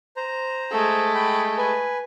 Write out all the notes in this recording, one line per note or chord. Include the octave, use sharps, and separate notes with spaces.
C5 A#5
G#3 A3
G5 B5
B4 G#5